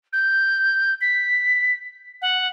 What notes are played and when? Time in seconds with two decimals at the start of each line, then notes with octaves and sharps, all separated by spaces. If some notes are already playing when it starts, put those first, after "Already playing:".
0.12 G6
1.01 B6
2.21 F#5